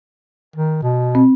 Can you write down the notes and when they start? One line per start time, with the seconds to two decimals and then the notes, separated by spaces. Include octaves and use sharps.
0.56 D#3
0.82 B2
1.15 C4